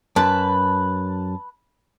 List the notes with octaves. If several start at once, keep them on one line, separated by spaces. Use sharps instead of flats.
F#2 B4 A5